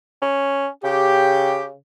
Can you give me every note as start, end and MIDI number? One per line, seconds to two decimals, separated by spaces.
0.22 0.69 61
0.84 1.76 49
0.84 1.62 67